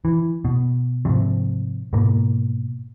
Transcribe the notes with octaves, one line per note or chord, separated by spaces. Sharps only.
E3
B2
G#2 C3 F3
G#2 B2 A#3